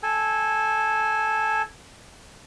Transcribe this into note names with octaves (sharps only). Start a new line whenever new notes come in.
A4 G#5